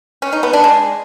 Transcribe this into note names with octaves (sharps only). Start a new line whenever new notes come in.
C#4
D#4
B3
D4
G#3